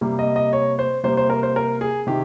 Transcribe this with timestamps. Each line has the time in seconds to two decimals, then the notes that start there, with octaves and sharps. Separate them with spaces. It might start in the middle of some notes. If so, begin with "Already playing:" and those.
0.01 C3 G3 A#3
0.19 D#5
0.36 D#5
0.53 C#5
0.79 C5
1.03 C3 G3 A#3 C5
1.17 C5
1.30 A#4
1.43 C5
1.56 A#4
1.81 G#4
2.07 C3 D#3 G4